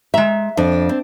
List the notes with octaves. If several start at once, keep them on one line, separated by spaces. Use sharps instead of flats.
G#3 E5 A#5
F2 D4
C4